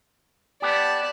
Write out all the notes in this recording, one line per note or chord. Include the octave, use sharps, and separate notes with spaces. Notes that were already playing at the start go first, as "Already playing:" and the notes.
B3 G4 D5 A5